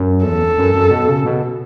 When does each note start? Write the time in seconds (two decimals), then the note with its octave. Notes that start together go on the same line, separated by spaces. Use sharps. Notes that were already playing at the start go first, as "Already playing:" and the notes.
Already playing: F#2
0.25 E2 A4
0.57 F#2
0.74 F#2
0.91 B2
1.08 C#3
1.24 B2